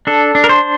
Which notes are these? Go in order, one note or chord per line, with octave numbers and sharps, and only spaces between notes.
D4 A4
D4
A#4
C5